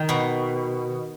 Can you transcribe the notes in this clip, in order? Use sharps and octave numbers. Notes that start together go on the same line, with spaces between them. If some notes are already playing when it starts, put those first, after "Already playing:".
Already playing: D#3
B2